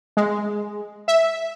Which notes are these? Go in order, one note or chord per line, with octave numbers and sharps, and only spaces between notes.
G#3
E5